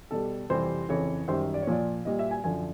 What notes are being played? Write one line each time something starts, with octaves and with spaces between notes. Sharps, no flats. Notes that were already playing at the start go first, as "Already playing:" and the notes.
B2 G3 A4
F2 C3 E3 G3 C5
F2 C#3 E3 C#5
F#2 D#3 G3 C5
D5
C#5
A#2 F3 D5
A#2 G3 D#5
E5
G#5
F#2 D3 F3 G#5